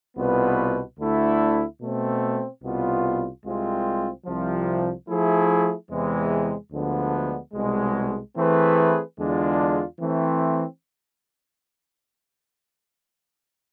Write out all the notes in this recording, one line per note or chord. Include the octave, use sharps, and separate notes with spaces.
C2 B2 B3 F4 B4
D2 D3 A3 E4
B2 A3 C4
C2 B2 B3 F4
C2 C3 G#3 C4 F4
C2 C3 F3
F3 A3 E4 G#4
E2 C3 E3 G#3
D2 D3 F3 G#3 B3
C2 B2 G#3
E3 A3 C4 G#4 B4
E2 D3 G#3 D4 F4
E3 A3 C4